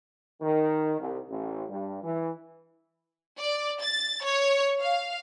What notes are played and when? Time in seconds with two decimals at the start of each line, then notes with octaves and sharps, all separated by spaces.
0.42 D#3
1.00 C2
1.29 A1
1.70 G2
2.03 E3
3.39 D5
3.82 A6
4.24 C#5
4.81 F5